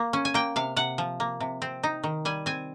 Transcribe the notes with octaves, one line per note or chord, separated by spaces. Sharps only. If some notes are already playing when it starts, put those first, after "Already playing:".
Already playing: A#3
C#4
G#5
A#3 G5
C3 F5
C3 F#5
F3
A#3
C3
C4
D#4
D#3
G3 G#5
C4 G#5